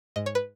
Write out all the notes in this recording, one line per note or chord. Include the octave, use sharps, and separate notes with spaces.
G#2 D#5
C#5
B4